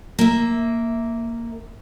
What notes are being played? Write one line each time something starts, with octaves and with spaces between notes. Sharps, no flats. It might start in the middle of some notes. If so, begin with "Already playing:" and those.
A#3 E5